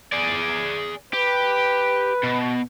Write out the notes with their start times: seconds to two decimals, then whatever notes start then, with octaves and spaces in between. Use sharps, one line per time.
0.12 G#4 D5
1.13 G4 B4
2.23 B2